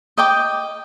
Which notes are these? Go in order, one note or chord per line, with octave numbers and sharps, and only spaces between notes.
D#5 G5 D6